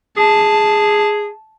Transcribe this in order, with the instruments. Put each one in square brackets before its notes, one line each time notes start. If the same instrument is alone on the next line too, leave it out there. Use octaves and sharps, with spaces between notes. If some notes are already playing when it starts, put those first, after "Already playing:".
[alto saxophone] G#4 [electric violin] A5